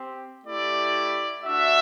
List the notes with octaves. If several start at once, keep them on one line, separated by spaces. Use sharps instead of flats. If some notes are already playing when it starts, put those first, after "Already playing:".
Already playing: C4 G4
A3 E4 G4 D5
A3 D4 F#4 E5